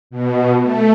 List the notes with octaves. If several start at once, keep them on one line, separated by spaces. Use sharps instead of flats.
B2
A3